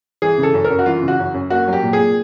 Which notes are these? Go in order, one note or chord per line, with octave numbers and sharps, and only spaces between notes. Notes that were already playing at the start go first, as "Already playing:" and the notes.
E3 G#4
C#3
A4
F#2
A#4
F#2
F#4
E3 F4
C#3
F#4
F#2
F#2
A#3 F#4
F#3
G4
A#2
G#4
A#2